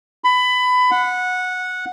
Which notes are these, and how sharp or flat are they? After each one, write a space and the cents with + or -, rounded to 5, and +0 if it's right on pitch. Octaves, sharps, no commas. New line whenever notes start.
B5 +20
F#5 -15